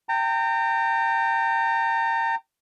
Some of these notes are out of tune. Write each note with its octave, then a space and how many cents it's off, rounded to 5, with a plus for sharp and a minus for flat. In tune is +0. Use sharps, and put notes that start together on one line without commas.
G5 +0 A#5 -35